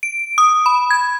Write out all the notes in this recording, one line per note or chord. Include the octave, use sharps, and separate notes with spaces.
D7
D#6
B5
G#6